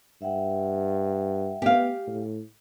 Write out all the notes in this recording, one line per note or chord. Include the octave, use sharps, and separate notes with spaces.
G2 E5 F#5 G5
B3 G4 F5
A2